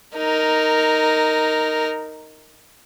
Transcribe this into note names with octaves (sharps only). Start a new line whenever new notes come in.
D#4 A#4